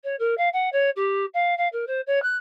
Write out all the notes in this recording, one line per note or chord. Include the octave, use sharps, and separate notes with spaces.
C#5
A#4
F5
F#5
C#5
G4
F5
F5
A#4
C5
C#5
F#6